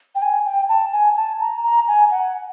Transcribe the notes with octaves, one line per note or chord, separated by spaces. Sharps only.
G5
G#5
G5
A5
G#5
A5
A#5
A#5
G#5
F#5